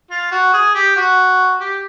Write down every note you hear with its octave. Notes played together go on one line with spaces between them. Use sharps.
F4
F#4
G#4
G4
F#4
G4